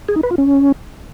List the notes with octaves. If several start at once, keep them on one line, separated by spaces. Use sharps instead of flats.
G#4
D#4
B4
F4
C#4